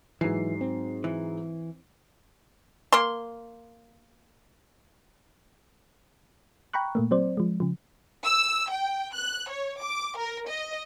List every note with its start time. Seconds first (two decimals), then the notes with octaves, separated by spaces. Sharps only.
0.21 G#2 E3 F#3 C7
0.61 C4
1.04 E3
2.92 A#3 C6
6.73 G5 A#5 B5 C#6 F#6
6.95 A#2 A3 A#3
7.11 F#3 C4 C5 D5
7.37 F3 G#3
7.60 C#3 F3
8.25 E6
8.71 G5
9.15 F#6
9.50 C#5
9.81 D6
10.18 A#4
10.49 D#5